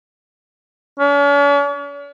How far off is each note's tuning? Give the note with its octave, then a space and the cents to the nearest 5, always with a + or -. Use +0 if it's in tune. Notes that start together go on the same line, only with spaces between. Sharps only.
C#4 +45